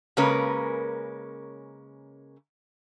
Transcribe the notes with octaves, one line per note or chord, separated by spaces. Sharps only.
C#3 G#3 A#3 C#4 A#4 B4